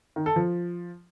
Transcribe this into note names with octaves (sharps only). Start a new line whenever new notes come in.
D#3
A4
F3